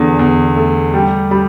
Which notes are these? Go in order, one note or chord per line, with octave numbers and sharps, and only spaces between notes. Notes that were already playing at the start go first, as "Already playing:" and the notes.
Already playing: E2 D3
E2
A3
G3 G5
G3 B5